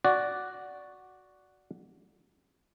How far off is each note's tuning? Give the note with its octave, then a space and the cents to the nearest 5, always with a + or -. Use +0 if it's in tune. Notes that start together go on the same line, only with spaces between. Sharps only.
F#4 +0 D5 -10